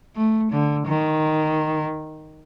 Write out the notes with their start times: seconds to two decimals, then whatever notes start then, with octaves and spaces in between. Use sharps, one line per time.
0.16 A3
0.51 D3
0.87 D#3